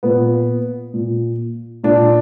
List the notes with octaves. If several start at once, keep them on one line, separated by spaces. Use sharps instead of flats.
A#2 B3
A#2
A#2 D4